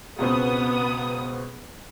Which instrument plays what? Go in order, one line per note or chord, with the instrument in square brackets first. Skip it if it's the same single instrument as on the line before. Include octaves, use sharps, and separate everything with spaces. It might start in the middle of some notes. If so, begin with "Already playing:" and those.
[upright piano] C#2 B2 C4 [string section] B3 D#6